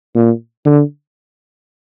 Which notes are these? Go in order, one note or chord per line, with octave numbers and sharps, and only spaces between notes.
A#2
D3